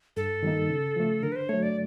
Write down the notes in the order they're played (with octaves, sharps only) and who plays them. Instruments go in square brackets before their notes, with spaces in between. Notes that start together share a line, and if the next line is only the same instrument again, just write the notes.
[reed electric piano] G2 [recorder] A4
[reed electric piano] D#3 G3 A#3 D#4
C#3
F3 A3
[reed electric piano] D3 [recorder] A#4
[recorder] B4
C5
[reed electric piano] F#3 A3 [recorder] C#5
[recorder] D5